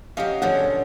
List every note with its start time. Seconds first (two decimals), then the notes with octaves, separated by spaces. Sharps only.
0.17 F#3 C#4 G4 D#5 F5
0.42 B2 D3 F3 G#4 C#5 F#5